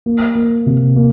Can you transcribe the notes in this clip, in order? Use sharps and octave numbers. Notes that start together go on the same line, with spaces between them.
A#3
A#3
C3
A#3